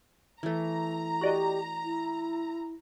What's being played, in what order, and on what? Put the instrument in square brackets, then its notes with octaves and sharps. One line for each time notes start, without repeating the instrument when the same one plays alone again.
[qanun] E3 A3 [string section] A#5
[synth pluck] F#4 D5 D#5 [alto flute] G4
[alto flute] E4